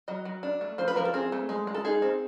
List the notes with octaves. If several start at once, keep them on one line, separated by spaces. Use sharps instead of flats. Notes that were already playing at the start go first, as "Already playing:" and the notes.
F#3 D#5
F#3
D4
A3
F3 C5
B4
F3 A#4
A4
C4 G#4
A3
G#3
G#3
A4
D#4 G#4
C4